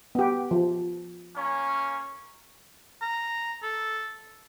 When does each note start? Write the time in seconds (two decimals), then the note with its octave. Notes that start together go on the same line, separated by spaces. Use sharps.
0.15 B3 G4
0.51 F3
1.37 A#3 C#4
3.02 A#5
3.63 A4